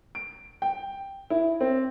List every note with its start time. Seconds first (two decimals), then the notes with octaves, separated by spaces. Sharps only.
0.15 D7
0.62 G5
1.30 E4
1.61 C4